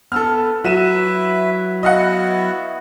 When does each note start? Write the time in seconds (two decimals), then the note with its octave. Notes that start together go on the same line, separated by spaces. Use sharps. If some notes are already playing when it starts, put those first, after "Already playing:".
0.12 B3 A4 E6 F6
0.64 F#3 E4 F#4 B4 E5 D#7 E7
1.83 B3 E4 F#4 D#5 F5 F#5